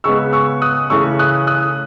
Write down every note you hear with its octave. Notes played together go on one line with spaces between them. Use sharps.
C#3 G#3 B3 C#6 E6
C#6 E6
D#6 F#6
C#3 E3 A3 C#4 C#6 E6
D#6 F#6
D#6 F#6